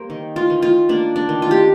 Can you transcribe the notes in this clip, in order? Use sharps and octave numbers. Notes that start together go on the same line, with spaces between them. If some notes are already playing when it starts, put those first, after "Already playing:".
Already playing: G3 A#3 A#4 C5
D#3
F4
D#3
F4
A#3 D4
D4
D#3
F4
G4